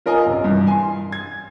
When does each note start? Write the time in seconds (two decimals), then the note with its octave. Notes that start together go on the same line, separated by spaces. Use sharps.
0.06 F4 A#4 D#5 G#5
0.26 A1 C3
0.44 G2 E3
0.67 G#5 C6
1.12 G#6